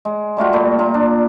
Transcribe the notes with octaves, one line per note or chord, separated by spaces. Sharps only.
G#3
G3 A3 F4 F#4
A#2 G3 A3
A#2 F4 A#5
D4